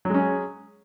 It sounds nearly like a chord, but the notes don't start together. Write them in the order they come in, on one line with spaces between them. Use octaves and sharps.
F#3 G#3 C#4 G#4